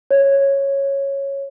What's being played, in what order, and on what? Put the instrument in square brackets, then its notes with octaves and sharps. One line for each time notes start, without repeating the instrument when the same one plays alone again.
[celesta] C#5